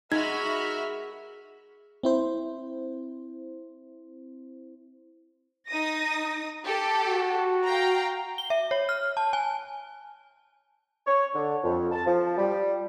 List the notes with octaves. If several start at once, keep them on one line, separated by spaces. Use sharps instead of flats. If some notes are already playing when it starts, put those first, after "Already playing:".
G#3 D#4 F#4 A#4 E5 B5 F6 G#6
C4 E4 C5
D#4 D#6 A#6
G4 A4
F#4
F5 G5 A#5
G7
E5
C#5
F6
A5
G#5
C#5
D3
F2
A5
F3
G3